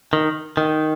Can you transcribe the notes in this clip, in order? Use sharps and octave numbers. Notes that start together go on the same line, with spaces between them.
D#3
D#3